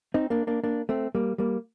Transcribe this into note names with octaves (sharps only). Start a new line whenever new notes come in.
C4 D#4
A#3 D4
A#3 D4
A#3 D4
A3 C4
G3 A#3
G3 A#3